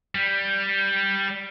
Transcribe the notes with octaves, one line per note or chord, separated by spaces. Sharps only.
G3